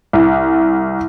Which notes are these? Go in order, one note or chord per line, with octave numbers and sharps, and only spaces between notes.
C2